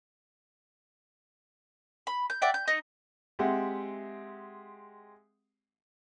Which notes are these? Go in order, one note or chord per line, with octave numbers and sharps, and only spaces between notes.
B5
G6
D5 E5 F#5 G5
G6
D#4 D#5
G#3 C4 G4 E5 F#5